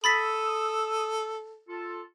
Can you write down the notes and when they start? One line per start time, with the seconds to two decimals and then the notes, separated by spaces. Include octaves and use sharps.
0.04 A4 B5 D#6 E6 A6 B6
1.68 F4 A4